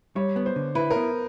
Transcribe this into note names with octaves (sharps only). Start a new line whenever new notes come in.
G3 C#5
B3
C5
D3
E4 B4
A#4
B3